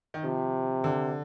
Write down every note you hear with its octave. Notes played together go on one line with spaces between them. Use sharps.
D#3
C3 F3
D3